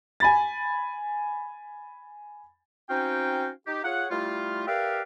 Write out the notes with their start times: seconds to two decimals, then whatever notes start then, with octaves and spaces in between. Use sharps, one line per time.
0.20 G#5 B5 A6
2.89 C4 C#4 D#4 F#4 F5 G5
3.67 D#4 G4
3.84 F4 G#4 C#5 F#5
4.10 G3 A3 E4 F4
4.67 G4 A#4 B4 D5 E5 F5